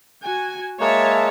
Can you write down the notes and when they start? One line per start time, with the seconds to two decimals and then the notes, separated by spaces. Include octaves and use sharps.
0.23 F#4 G#5
0.81 G#3 A#3 C#5 E5 A5